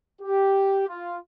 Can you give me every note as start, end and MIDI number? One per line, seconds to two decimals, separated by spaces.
0.21 0.86 67
0.88 1.17 65